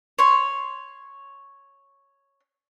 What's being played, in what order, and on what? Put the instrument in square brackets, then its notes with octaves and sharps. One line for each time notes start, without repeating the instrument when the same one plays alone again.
[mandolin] C#5 C6